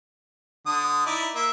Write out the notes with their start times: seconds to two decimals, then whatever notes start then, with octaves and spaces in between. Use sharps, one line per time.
0.66 D3 D#6
1.06 D#4 E4 D5
1.35 A#3 E5